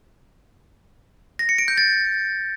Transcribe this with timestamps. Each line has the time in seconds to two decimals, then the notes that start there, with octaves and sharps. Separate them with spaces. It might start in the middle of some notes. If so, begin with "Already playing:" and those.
1.39 A#6
1.49 C#7
1.58 D7
1.68 G6
1.78 A6